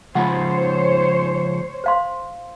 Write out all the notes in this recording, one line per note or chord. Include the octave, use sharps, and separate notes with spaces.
C#3 F3 G#3 F4 C5 C#5 F#5
C5 F5 C6